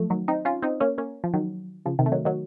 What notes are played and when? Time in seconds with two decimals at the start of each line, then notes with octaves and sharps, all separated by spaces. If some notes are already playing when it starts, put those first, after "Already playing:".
Already playing: F3 F#3 A3
0.10 D#3 F#3
0.28 C4 D#4
0.45 C#4 F4
0.62 C4 D#4
0.80 A#3 C#4
0.98 A#3 C#4
1.24 F3
1.34 D#3 F#3
1.85 C#3 F3
1.99 C3 D#3
2.06 A3
2.12 D#3 F#3
2.25 D#3 F#3